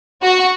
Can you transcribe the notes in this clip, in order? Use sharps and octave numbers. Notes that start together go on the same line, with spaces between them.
F#4